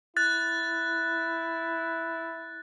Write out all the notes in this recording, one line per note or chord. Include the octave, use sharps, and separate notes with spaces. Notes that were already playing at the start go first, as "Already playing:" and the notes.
E4 F#6 A6